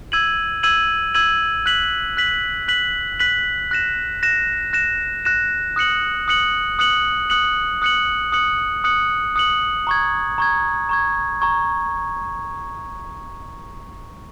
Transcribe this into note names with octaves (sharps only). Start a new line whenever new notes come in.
E6 G#6 D#7 F#7
E6 G#6 D#7 F#7
E6 G#6 D#7 F#7
F#6 B6 F#7
F#6 B6 F#7
F#6 B6 F#7
F#6 B6 F#7
F#6 A#6 E7
F#6 A#6 E7
F#6 A#6 E7
F#6 A#6 E7
D#6 F#6 C#7 F#7
D#6 F#6 C#7 F#7
D#6 F#6 C#7 F#7
D#6 F#6 C#7 F#7
D#6 F#6 C#7 F#7
D#6 F#6 C#7 F#7
D#6 F#6 C#7 F#7
D#6 F#6 C#7 F#7
A#5 C#6 G#6
A#5 C#6 G#6
A#5 C#6 G#6
A#5 C#6 G#6